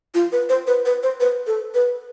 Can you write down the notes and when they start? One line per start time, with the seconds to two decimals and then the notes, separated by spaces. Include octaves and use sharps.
0.14 F4
0.32 B4
0.49 C5
0.67 B4
0.85 B4
1.03 C5
1.20 B4
1.47 A4
1.74 B4